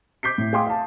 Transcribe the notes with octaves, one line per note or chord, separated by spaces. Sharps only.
D6 G6 B6 C7
A2
G#4 F5 G5 C6 D6 D#6
F5 A5